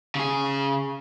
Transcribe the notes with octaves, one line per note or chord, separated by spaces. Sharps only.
C#3 G#4